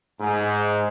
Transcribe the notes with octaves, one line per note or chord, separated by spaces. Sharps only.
G#2